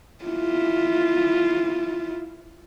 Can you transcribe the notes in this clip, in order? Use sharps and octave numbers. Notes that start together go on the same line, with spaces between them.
E4 F4